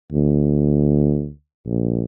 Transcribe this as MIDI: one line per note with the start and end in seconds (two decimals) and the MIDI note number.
0.12 1.29 38
1.66 2.04 34